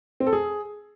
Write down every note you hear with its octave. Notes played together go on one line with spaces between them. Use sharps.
C4
A4
G#4